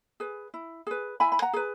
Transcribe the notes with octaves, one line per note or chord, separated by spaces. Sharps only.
G#4 B4
E4
G#4 B4
E4 G#5 B5
B5
F#5 A#5
G#4 B4